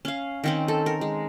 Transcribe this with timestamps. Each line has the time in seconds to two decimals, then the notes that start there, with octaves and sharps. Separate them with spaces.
0.05 C#4 F5
0.44 D#3 C4 C#4
0.68 A4
0.86 A#4
1.01 G#3